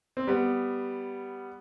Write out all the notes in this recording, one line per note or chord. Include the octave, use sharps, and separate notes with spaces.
C4
G3 B3